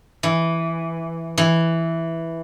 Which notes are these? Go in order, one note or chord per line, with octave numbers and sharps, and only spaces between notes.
E3
E3